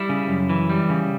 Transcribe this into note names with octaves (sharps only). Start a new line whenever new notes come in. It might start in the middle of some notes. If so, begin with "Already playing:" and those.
Already playing: G3 E4
C#3
F#2
E3
G3
C#3